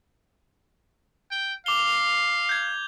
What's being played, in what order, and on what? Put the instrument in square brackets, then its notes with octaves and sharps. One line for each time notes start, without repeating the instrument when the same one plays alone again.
[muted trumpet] G5
[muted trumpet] F5 [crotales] D6 F7 G7
[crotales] G6 G#6